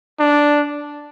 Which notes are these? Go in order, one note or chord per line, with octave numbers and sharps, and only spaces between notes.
D4